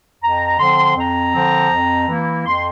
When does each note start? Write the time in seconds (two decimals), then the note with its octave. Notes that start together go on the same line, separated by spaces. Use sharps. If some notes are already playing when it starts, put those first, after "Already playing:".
0.22 F2 A#5
0.59 D3 F3 C4 C6
0.97 F2 A#5
1.34 D3 F3 C4
1.71 F2
2.08 E3 A#3 E4
2.46 F2 C6